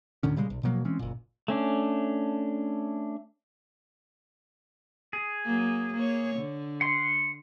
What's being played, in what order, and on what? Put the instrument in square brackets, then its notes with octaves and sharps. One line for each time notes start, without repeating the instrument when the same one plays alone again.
[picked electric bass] D2 A2 D3 C#4
A#2 C#3 G3 G#3
B1
B2 F3 F#3 A#3
E3 G#3 C4 C#4
F#1 A#2
[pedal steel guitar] A3 C#4 D4
G#4
[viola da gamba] F#3 A#3
A#3 C#5
D3
[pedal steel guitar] F#5 C6